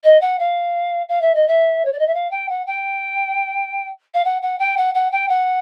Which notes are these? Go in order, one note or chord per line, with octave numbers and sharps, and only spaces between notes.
D#5
F#5
F5
F5
E5
D#5
E5
C#5
D5
D#5
E5
F5
G5
F#5
G5
F5
F#5
F#5
G5
F#5
F#5
G5
F#5